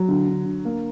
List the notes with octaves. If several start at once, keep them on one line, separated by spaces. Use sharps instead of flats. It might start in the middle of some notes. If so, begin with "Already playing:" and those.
Already playing: F#3
D3
D3
D3
A#3